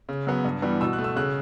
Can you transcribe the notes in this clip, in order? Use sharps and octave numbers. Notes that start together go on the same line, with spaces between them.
C#3
F#3 B3
G2
E3 G3 B3
B2 E6
F#6
A3
E6
C#3 F#6